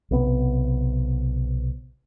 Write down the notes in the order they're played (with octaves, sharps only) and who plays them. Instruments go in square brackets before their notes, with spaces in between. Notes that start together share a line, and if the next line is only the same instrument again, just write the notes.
[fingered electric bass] B1 C3 B3